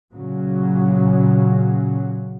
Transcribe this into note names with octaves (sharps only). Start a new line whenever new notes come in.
A#2 C#3 F#3